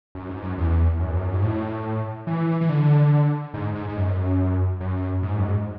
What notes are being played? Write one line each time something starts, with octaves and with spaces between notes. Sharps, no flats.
F#2
G#2
F#2
E2
F#2
E2
F#2
G#2
A2
E3
E3
D3
G#2
G#2
G#2
F#2
F#2
G#2
F#2
G#2